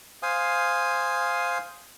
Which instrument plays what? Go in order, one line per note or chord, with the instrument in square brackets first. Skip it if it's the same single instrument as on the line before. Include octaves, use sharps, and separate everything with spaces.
[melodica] C5 F5 G#5 D#6